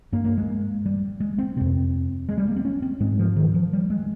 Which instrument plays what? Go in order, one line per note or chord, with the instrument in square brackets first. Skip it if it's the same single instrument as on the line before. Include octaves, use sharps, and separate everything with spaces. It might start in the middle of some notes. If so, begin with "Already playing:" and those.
[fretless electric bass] G2 A#3
A#3
G#3
G3
G#3
C4
F2 C3 C4
G#3
G3
A#3
C4
C#4
C4
G#2 G#3
F3
D#3
F3
G3
G#3